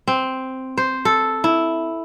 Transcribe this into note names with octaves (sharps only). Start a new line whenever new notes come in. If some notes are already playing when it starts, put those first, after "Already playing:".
C4
C5
A4
E4